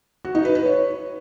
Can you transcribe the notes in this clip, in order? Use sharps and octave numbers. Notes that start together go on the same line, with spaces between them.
F#4
D#4
B4
B4
C#5